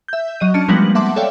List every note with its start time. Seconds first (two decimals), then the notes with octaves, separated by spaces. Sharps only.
0.08 E5 G6
0.40 F#3 D#5 D#7
0.54 C#4 D4 A5 F6 C#7
0.68 F3 G3 G#3 A#3 B3 F#7
0.95 E5 F#5 A5 C6 D6
1.16 A4 C#5 D5 E5 F5 G5